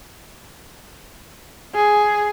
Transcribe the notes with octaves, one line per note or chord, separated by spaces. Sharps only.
G#4